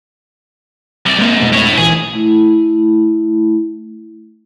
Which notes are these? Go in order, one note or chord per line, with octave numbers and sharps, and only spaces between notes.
C2 D5
G#2 G#3 A#3
F2 B2 A3
E4 C#5
A#1 E3 G#4
A3 E4